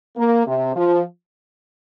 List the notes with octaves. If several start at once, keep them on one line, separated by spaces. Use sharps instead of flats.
A#3
C3
F3